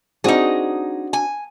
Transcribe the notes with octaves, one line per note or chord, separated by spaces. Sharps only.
C4 D4 D#4 F#4 G#4
G#5